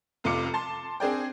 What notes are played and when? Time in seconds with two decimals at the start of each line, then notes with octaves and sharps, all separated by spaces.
0.24 F1 F2 C3 F4 D6 C#7
0.54 A5 C6
1.00 C4 D4 G#4 D5 G5